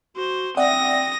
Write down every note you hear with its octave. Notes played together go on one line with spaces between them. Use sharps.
F#4 C5
C4 D5 E5 F#5 D#6 A#6